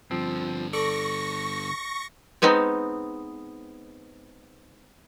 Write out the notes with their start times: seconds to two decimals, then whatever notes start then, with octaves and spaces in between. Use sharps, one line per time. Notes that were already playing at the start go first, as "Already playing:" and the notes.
0.11 G2 D3 F3 C4
0.73 A4 D5 C#6 A#6
2.42 G#3 B3 C4 D#4